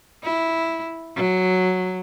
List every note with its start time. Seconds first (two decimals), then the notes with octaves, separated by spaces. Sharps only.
0.23 E4
1.16 F#3